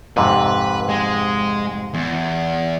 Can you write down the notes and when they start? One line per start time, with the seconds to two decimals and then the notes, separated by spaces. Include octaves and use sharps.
0.17 F2 G#2 C3 B4
0.89 G#3
1.94 E2